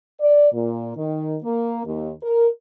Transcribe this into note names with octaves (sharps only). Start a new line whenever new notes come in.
D5
A#2
D#3
A#3
D#2
A#4